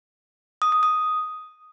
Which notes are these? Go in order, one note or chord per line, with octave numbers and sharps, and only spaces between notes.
D#6
D#6
D#6